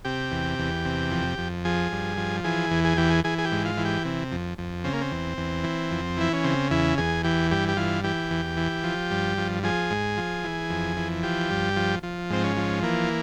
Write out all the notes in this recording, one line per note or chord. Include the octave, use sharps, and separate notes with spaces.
C3 G4
E2
E2
C3
F2
F2
F3 G#4
G2
F3
E3 G#4
E2
G#4
E3 G4
G#4
E3 G#4
G#4
G4
G#2
F4
E3
G4
C3
F2
F2
C#3 C4
A#3
C4
E2
E2
E3
F2
E3 E4
C#4
C#3 C4
E2 E4
E2 G#4
E3 G4
G2 G4
G4
E3 F4
E3 G4
E2
E3
F3
G2
F3
F3 G#4
G#2
F3
E3
F2
E3
F3 G4
G2
F3
F3
G#2 C4
C#4
F3
E3 A#3